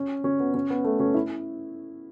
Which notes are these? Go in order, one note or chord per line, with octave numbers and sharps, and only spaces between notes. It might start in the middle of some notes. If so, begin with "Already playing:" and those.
Already playing: C#4
C#4
B3
C#4
B3
A3
C#4
E4